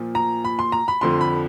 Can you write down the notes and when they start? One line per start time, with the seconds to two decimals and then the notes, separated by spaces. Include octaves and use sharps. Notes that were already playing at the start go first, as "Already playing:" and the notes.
Already playing: A#2 F3
0.15 A#5
0.44 B5
0.59 C6
0.72 A#5
0.88 B5
1.01 F2 D3 F3 C6
1.21 B5